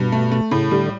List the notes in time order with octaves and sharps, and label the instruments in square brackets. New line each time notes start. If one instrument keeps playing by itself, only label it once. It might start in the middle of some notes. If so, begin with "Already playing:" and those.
Already playing: [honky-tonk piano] G2 [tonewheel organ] B2
[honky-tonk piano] A3
A3
[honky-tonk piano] A2 [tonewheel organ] C#3
[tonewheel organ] D3 [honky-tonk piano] G3